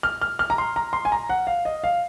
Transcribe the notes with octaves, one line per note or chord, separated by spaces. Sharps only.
F6
F6
F6
A#5
C6
A#5
C6
G#5
A#5
F#5
F5
D#5
F5